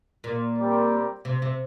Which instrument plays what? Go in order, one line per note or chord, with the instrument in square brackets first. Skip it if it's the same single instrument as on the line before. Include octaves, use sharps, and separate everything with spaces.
[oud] A#2
[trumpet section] G3 C4 G4 A#4 D5
[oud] C3
C3